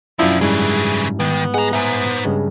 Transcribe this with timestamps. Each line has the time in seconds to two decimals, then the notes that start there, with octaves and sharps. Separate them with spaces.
0.19 B1 F#2 F3 D4 E4 F4
0.41 G#2 C#3 E3 G3 E4 G#4
1.20 D#3 B3
1.54 G#4 D#5 F#5 A#5
1.73 D#4 C5 E5 G#5 A#5
2.25 G2 C#3 G#3